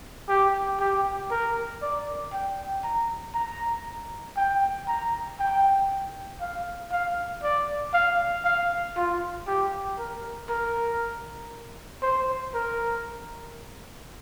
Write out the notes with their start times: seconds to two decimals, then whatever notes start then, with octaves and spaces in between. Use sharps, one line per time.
0.29 G4
0.80 G4
1.31 A#4
1.82 D5
2.33 G5
2.84 A#5
3.34 A#5
4.37 G5
4.88 A#5
5.40 G5
6.41 F5
6.92 F5
7.43 D5
7.94 F5
8.45 F5
8.96 F4
9.48 G4
9.99 A#4
10.49 A#4
12.03 C5
12.54 A#4